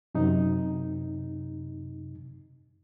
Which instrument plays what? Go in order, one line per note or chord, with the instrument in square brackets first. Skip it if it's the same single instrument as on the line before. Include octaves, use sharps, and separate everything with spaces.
[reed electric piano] F#2 C3 D#4